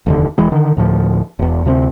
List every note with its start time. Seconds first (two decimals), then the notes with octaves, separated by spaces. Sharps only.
0.06 F1 D#2 D3
0.38 E1 E3 G#3
0.52 D3 D#3
0.77 D2 A2 F3
1.39 E1 E2
1.65 D2 C3 F#3 C4